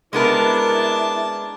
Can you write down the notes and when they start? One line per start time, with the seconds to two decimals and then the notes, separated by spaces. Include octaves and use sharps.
0.13 G#3 B3 D4 E4 A#4 A5